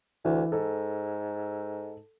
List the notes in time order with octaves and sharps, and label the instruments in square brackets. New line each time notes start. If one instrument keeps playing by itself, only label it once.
[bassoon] D2 [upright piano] E3
[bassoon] G#2 [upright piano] A4